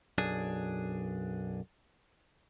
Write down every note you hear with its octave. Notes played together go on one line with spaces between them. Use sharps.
B1 F#2 D4 G#4